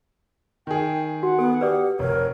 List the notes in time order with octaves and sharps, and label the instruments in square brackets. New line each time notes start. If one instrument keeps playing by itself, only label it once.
[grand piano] D#3 G#4 [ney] G5
[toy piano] F#4 [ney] F#5
[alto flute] B3 [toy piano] A4
[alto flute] G4 [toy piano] B4 D5 D#6
[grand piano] F1 [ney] A#4 [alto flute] C#5